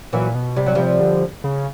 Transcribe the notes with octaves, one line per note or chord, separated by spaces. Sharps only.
A#2 E3 F#3
B2
C3 G3
F#3
C3 F3 G3
D3
C#3